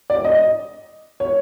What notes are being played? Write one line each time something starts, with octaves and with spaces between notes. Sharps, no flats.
D5
D#5
C#5